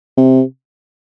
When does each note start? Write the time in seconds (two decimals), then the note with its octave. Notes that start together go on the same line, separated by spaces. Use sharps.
0.17 C3